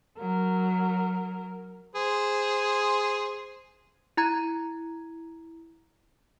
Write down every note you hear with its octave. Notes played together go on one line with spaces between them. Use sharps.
F#3 A#4
G#4 C5
E4 A#5 G#6